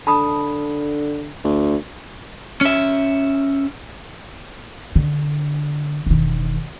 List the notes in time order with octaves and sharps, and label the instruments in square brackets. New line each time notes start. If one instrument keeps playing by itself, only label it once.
[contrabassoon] D3 [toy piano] A5 B5 D#6
[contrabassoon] D2
[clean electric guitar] C#4 E5
[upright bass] D3
E1 D#3